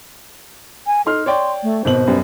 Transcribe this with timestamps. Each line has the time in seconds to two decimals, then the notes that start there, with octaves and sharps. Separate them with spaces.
0.87 G#5
1.06 D#4 A4 C6 F6
1.26 C#5 D5 G5 C6
1.63 A3
1.85 G#1 B2 C5 F#7
2.07 F#2 G3 B3